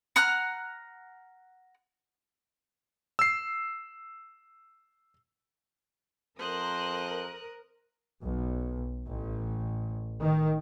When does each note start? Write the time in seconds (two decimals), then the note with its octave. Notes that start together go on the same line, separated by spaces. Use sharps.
0.16 F#5 A#5 F6 F#6
3.19 E6 C7
6.39 F2 A#4 C5 D#6 F#6
8.23 B1
9.08 A1
10.20 D#3